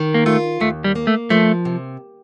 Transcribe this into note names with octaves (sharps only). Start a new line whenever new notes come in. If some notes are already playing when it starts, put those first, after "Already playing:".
Already playing: D#3
A#3
A3 F4
D#2 A3
G3
A#3
A3
F3 A3
C3